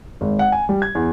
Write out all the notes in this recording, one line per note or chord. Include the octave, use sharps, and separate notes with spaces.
G#1
F#5
G#5
G3
G#6
E2